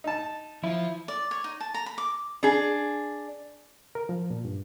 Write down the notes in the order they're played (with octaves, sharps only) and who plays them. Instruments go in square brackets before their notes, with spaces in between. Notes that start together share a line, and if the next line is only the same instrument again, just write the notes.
[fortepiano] D#4 A5
[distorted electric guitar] F3 [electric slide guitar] E4
[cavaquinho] D5
C#5
D#4
A5
A#5
B5
D6
[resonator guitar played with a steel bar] D4 G#4
[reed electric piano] A#4
F3
A#2
G2